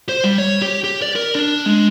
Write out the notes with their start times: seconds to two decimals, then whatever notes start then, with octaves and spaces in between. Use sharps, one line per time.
0.09 C5
0.24 G3
0.38 C#5
0.62 G4
0.84 G4
1.02 D5
1.16 A#4
1.35 D4
1.66 G#3